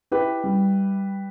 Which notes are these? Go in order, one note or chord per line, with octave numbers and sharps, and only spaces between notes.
E4 G4 B4
G3